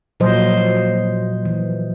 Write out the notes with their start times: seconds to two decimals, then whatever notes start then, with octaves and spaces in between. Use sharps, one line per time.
0.20 A#2 F3 F#3 C5 D#5
1.45 E3